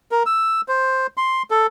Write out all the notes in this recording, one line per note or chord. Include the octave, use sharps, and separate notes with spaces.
A#4
E6
C5
C6
A4